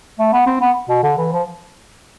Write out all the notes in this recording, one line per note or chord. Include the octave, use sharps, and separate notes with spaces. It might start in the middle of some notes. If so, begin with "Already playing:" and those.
A3
B3
C4
B3
B2
D3
E3
F3